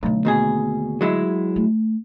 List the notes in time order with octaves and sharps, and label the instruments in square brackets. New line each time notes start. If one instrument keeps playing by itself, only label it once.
[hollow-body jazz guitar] B1 [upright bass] D3 A3
[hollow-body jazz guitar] D#2 B2 G#4
F#3 G#3 E4
[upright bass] A3